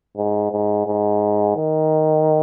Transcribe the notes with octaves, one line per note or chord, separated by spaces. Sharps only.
G#2
G#2
G#2
D#3